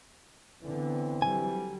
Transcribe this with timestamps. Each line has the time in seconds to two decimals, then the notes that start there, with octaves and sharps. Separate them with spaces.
0.63 D3 E3 B3 C4
1.22 D3 F#3 G3 G#5